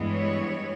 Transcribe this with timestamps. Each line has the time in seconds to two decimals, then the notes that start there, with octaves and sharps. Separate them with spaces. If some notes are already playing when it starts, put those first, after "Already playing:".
Already playing: G2 E3 G#3 B3
0.10 C#5